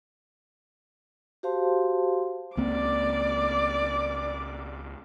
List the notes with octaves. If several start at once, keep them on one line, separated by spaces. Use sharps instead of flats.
F#4 G4 C5 F5 A5 C6
C#2 A#3 C4 D5 D6